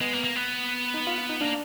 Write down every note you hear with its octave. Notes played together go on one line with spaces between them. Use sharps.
G#3 B3
A#3
A#3
B3
D#4
F4
F4
D#4
A#3 D4